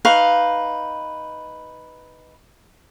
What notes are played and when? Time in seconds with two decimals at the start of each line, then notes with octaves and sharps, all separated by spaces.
0.05 D#4 B4 F5 C#6